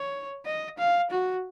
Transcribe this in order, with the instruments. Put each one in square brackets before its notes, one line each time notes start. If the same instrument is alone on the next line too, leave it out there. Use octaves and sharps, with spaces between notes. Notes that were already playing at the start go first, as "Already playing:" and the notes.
Already playing: [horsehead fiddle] C#5
D#5
F5
F#4